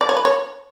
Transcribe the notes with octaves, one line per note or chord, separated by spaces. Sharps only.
D5
C#5
B4
C#5